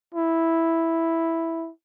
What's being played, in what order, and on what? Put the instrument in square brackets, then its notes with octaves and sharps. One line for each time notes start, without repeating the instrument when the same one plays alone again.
[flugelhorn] E4